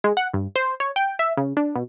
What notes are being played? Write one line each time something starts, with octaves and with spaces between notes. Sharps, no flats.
G#3
F#5
G2
C5
C#5
G5
E5
C#3
D4
B2